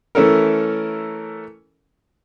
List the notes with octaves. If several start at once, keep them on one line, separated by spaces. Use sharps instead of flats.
E3 A3 C#4 A4 A#4